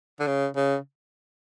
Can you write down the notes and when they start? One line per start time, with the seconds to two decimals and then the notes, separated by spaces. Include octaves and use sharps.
0.20 D3
0.27 C#3
0.56 C#3